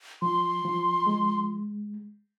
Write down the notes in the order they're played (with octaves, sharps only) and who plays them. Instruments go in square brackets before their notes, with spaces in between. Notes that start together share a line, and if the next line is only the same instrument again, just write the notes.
[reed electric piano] F3 [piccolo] C6
[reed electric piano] F3
G#3